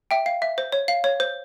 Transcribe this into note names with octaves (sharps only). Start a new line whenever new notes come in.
E5 G5
F5
E5
C5
C#5
F5
C#5
C5